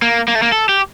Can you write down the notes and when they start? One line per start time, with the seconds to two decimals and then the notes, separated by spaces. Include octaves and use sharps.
0.02 A#3
0.28 A#3
0.35 A3
0.42 A#3
0.52 A4
0.69 G4